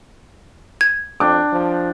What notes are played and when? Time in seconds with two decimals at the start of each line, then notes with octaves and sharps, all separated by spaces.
0.81 G#6
1.20 F2 D4 G5 D6
1.52 F3